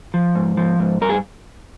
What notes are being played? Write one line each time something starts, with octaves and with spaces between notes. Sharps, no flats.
F3
G#2
F3
G#2
G2 A#4
G#4